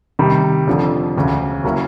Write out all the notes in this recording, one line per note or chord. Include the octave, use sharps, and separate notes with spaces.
C3 D#3 G3
F1 F2 D3 F3
E1 D2 C#3
C#3 F#3 A#3 C#4 E4